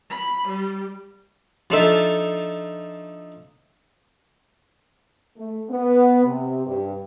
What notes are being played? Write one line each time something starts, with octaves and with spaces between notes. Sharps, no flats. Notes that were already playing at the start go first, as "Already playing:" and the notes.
B5
G3
F3 D4 D#4 F4 A4 E5
A3
B3
C3
G2